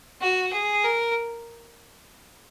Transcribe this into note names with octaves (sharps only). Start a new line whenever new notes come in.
F#4
G#4
A#4